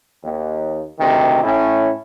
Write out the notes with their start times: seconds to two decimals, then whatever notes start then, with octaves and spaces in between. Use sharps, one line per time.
0.24 D#2
1.00 D2 C3 D#3
1.44 A2 C#4 E4